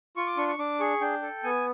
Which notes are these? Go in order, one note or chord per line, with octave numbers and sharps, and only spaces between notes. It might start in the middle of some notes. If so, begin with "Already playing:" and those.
F4 C#6
D6
D4 C#6
C#6
D4 D6
G#4 C#6
D4 G5
A4
B3 G#5